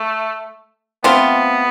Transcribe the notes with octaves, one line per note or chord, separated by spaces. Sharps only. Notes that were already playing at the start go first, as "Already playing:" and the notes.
Already playing: A3
A3 B3 C4 F4